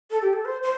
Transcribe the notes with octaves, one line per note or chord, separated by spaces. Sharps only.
A4
G4
A4
C5
C5